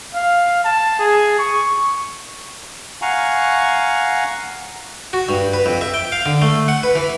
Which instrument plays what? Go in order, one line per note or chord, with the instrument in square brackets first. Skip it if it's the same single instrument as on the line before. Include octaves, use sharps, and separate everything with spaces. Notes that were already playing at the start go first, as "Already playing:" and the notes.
[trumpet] F5
A5
G#4
C#6
[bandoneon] F5 F#5 G#5 A#5 C#6
[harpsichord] F#4
G2
B4
F2
E5
G5
F5
D3
A3
F#5
B4
E3